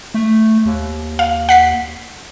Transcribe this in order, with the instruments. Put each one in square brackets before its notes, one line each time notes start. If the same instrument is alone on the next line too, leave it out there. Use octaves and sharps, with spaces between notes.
[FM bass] A3
D#2
[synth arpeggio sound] F5
F#5 B6 C7